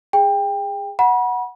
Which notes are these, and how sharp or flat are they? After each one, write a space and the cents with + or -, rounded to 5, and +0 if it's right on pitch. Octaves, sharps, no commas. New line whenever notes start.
G#4 -20 G5 +20
F#5 -5 B5 -35